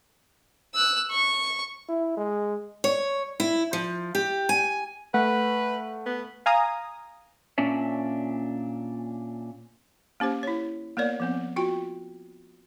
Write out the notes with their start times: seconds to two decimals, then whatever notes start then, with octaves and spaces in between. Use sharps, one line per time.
0.74 E6 F#6
1.11 C#6
1.89 E4
2.17 G#3
2.84 C#5
3.40 E4
3.73 F3
4.15 G4
4.49 G#5
5.14 A3 B4 F#5
6.06 B3
6.46 F5 G#5 A#5 D#6
7.58 A#2 C#4 D4 E5
10.20 A#3 C#4 G4 C5
10.43 E4 C#5
10.97 A#3 B3 A#4 C#5 D5
11.20 F3 B3 C4
11.56 F4 F#4 G5